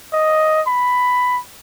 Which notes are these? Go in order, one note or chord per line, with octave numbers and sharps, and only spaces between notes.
D#5
B5